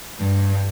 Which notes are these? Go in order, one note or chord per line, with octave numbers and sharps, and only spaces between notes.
G2